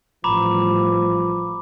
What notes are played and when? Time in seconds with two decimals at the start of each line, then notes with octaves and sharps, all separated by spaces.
0.24 A1 F3 G3 A#5 B5 D6